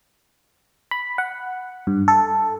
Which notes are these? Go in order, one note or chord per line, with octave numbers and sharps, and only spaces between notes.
B5
F#5
G2
A4